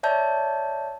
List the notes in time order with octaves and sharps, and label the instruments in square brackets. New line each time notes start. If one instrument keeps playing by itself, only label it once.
[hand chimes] C#5 D5 E5 A5 G6